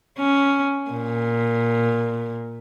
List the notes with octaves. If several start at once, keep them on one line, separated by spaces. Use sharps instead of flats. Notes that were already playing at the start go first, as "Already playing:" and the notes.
C#4
A#2